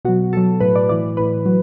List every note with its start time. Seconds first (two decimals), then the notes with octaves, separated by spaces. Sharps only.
0.05 B2 F#3 F#4
0.33 B2 F#3 A4
0.60 A2 F#3 B4
0.76 D5
0.89 A2 E3 D5
1.17 A2 E3 B4
1.46 F#3